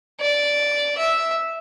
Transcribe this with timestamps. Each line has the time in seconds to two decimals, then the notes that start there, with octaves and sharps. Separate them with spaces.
0.21 D5
0.98 E5